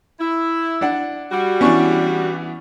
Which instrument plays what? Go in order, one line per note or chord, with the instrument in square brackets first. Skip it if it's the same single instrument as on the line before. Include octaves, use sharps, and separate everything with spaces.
[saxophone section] E4
[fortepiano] D4 D5 F#5
[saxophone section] G3 F#4
[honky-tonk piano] E3 B3 [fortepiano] C#4 D4 C#6